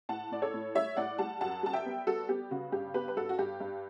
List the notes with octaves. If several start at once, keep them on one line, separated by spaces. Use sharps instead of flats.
A2 F#5 A5
A2 D5
A4 C#5
A2
G3 C#5 E5
A2 D5 F#5
G3 F#5 A5
F#2 F#5 A5
G3 A5
E5 G5
B3
G3 F#4 A4
B3 G4
C#3 F#4
G2 G4
B3 G4 B4
B4
G2 F#4 A4
F#4
G2 G4
G2